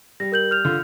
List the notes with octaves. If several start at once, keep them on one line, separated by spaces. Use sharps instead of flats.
G3 A#6
A#4 G6 F#7
F6 G6 F7
D3 F4